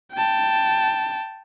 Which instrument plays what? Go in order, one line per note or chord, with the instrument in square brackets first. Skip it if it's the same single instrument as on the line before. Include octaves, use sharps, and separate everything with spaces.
[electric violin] G5 A5